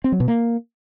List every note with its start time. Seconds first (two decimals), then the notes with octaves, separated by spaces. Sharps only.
0.04 C4
0.12 F#3
0.20 B2
0.28 A#3